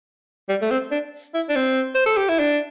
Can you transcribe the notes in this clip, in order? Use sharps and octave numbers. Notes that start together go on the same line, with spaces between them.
G3
A3
C4
D4
E4
D4
C4
C5
A4
G4
E4
D4